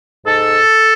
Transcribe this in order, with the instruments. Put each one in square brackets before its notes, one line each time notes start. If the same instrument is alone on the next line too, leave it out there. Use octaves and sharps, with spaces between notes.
[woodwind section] G#2 A4